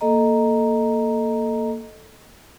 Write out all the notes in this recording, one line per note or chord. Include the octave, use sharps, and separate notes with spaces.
A#3 A4 D#5 A#5